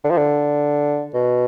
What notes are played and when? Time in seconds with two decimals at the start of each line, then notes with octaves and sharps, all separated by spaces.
0.04 D3
0.11 F3
0.17 D3
1.15 B2